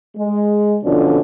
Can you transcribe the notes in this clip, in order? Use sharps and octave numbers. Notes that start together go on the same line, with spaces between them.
G#3
F2 B2 D3 F3 C#4 D4